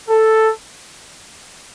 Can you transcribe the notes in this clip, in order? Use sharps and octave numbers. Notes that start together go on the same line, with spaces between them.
A4